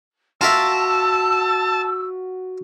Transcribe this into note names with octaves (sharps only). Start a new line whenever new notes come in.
F4 F#4 A#4 E5 A5 E6